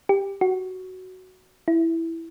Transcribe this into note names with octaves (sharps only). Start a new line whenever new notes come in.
G4
F#4
E4